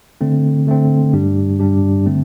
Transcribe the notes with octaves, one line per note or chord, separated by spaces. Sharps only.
D3 A3 C4
D3 A3 C4
G2 G3 D4 G4
G2 G3 D4 G4
D3 A3 C4